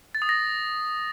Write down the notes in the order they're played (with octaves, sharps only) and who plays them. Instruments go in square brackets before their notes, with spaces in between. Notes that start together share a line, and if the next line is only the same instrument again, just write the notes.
[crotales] A6
D#6
A#6